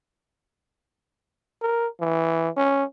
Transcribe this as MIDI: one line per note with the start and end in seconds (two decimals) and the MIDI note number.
1.62 1.87 70
2.00 2.50 52
2.57 2.84 61